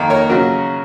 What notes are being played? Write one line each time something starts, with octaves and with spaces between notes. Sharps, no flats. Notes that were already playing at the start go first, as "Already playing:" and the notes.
Already playing: F2 D#3 A#3 D#4
A#4 C#5
C#3 F#3 C#4 F#4 A#4